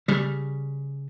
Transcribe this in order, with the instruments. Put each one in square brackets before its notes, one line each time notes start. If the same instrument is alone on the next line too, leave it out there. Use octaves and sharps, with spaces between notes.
[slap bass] C#3 G3